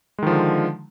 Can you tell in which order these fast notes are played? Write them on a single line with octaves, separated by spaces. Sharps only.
G#3 D#3 F3 D3